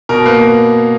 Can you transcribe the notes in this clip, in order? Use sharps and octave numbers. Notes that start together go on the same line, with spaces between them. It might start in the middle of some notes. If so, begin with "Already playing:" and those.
B2 A#4
A#3 B4